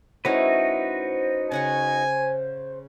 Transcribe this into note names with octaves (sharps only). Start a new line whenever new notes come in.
A3 C#4 D#4 E4 F#4 B4 C5
C#3 F#5 G#5 C#6